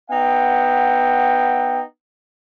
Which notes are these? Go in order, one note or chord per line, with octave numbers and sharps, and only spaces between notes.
B3 D#4 E5 F#5 G5